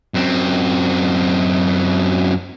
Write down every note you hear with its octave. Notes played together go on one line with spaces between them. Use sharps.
F#2 C4